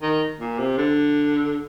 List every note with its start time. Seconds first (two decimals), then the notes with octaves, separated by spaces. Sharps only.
0.02 D#3
0.40 A#2
0.59 C3
0.78 D3